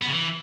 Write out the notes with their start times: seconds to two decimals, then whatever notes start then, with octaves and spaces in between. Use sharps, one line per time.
0.02 B3
0.07 C#3
0.12 E3